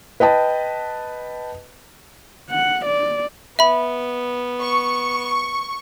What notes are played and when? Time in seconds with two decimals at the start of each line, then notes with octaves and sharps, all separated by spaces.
0.20 B4 D#5 G5 A5
2.50 F#5
2.86 D5
3.59 B3 E5 B5
4.62 C#6